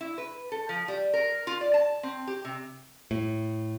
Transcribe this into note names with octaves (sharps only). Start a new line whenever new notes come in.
E4
B4
A4
F3
G3
A#4
F4
D5
A5
C4
G4
C3
A2